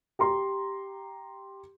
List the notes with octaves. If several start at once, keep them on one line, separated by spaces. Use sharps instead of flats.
G4 A#5 C6